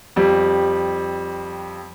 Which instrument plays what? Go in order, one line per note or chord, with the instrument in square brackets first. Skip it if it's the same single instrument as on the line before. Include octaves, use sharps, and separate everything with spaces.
[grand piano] F2 G3